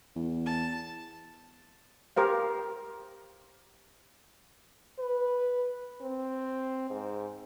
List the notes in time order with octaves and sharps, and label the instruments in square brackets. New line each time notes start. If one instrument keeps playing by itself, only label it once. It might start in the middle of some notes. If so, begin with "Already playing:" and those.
[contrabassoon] E2
[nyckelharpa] A5
[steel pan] G4 A#4 C5 F5
[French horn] B4
C4
G#2